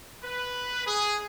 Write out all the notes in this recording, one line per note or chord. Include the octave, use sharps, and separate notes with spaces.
B4
G#4